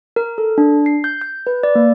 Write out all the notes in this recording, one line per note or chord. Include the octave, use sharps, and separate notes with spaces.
A#4
A4
D4
C7
G6
G6
B4
D5
A#3